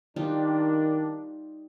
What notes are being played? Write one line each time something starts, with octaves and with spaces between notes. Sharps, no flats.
D#3 G3 D4 D#4 F4